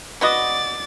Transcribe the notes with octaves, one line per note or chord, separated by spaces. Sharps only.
B3 F#4 D5 D#5 A6